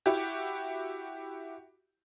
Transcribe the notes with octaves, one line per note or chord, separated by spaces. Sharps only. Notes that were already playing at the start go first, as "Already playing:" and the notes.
E4 F#4 G4